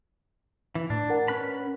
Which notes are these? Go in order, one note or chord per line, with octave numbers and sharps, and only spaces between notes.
E3
A2 D4
A#4 F#5
C#4 B4 B5